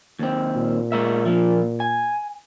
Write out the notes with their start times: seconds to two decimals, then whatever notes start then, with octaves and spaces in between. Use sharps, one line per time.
0.19 D#2 C4
0.56 A#2
0.92 G#3 A#4 E5
1.26 F3 A#3
1.80 G#5